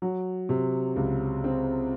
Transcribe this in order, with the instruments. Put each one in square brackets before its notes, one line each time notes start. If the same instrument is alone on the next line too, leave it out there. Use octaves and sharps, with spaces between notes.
[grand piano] F#3
C3
C#2
C4